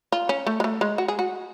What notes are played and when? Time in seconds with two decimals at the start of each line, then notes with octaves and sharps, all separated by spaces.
0.12 F4
0.29 C#4
0.47 A3
0.60 G#3
0.64 A3
0.81 G#3
0.98 F#4
1.08 G#4
1.19 F#4